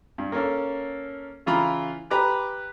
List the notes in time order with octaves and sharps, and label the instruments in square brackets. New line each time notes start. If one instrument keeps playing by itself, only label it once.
[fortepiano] G2
A#3 C#4 A4
C#3 E3 F4 A#5 B5
G4 B4 A#5 B5 D6 F#6